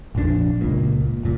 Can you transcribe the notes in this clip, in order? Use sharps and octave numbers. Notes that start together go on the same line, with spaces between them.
A#1 F2 D#3 D4
C#2 A#2
F#1 A#2